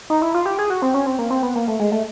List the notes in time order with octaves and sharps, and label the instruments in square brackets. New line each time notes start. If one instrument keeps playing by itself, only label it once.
[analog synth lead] D#4
E4
F4
G4
G#4
F#4
C4
C#4
C4
A#3
C4
B3
A#3
A3
G#3
A3